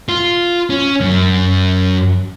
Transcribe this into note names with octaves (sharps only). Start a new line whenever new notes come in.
F4
C#4
F#2